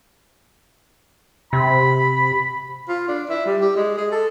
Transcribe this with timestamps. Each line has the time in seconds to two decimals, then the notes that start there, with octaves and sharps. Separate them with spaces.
1.53 C3 B5
2.89 F4
3.08 D4
3.29 E4
3.46 G3
3.61 G4
3.76 G#3
3.98 G#4
4.12 A4